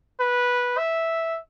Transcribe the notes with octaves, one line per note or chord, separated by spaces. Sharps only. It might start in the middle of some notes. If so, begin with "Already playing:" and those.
B4
E5